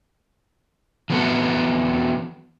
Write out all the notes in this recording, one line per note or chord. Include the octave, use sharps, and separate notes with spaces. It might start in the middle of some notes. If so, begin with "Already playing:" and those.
E3 F#3 A3 B3 F#4 A4